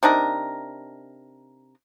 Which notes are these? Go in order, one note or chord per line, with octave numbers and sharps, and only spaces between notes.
C3 D4 D#4 A#4